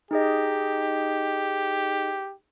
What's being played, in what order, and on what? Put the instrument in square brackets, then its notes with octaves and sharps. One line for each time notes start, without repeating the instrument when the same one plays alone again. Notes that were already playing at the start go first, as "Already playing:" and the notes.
[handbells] D#4 G#4 D#5 [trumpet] G4